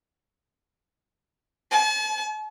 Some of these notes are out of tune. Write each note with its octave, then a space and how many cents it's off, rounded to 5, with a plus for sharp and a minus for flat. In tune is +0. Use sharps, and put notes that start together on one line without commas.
A5 -45